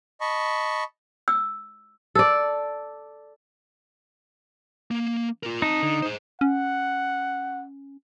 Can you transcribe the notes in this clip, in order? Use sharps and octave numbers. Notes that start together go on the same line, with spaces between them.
D#5 A5 B5 C#6
E6
A4 D5
A#3
F4 A#4
C4 D#4 A5
D3
G#4 C5
C#4 F#5